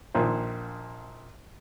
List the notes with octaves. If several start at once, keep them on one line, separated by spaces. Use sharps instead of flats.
A#1 A#2 D#3 C5